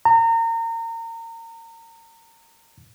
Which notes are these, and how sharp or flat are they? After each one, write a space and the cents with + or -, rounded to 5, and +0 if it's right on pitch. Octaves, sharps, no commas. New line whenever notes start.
A#5 -30